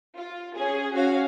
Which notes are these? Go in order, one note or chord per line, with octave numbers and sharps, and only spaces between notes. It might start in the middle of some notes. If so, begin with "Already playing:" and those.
F4
C#4 G#4
C#4 F#4 F5